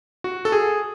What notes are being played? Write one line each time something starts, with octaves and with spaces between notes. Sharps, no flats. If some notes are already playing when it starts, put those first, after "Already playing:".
F#4
A4
G#4